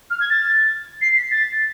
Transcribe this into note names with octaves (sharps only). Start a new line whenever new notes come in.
F6
G#6
A6
C7
B6
A6